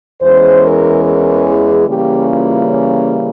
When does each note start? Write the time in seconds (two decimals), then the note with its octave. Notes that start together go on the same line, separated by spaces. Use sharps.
0.22 E2 E3 G#3 C#4 C5
0.63 A#4
1.05 A#4
1.46 G#4
1.87 C#3 E3 G3 A#3 C#4 G4
2.29 F4
2.70 C#4